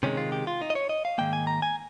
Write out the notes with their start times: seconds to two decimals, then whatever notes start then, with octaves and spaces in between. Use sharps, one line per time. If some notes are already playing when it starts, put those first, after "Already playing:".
0.03 C3 D#3 G#3 C#4
0.17 F4
0.32 G4
0.47 F4
0.62 D#4
0.70 D#5
0.75 C#5
0.89 D#5
1.05 F5
1.18 G#2 D#3 A#3 G5
1.33 G#5
1.47 A#5
1.62 G#5